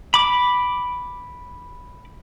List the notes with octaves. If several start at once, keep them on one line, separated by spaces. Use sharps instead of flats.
B5 D6